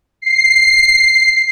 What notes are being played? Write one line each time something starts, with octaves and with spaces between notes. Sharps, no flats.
C7